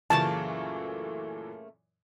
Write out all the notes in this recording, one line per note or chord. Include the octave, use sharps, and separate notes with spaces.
F#2 A#2 C#3 E3 A3 A#3 A5